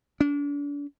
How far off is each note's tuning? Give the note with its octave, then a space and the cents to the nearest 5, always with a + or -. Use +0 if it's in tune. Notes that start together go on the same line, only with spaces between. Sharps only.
D4 -35